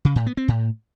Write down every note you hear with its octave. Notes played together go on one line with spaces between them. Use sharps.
C#3
A2
B3
C4
A2